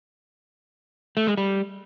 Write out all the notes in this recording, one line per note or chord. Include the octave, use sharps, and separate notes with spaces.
A3
G#3
G3